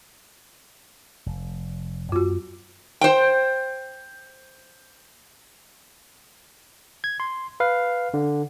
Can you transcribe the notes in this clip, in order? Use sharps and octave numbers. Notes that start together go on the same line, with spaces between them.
F1
F#2 B3 F4 F#4
C5 G5
G#6
C6
B4 F5
D3